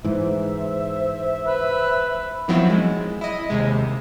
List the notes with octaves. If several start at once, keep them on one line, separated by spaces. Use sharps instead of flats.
G#2 E3 C5 E5
B4
D#3 F3 F#3 B3 C4 E4
G#3
E4 D#5
D#2 C3 G#3